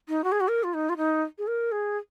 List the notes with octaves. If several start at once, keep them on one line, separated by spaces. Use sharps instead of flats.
D#4
F#4
G#4
F#4
A#4
F4
D#4
F4
D#4
G#4
A#4
G#4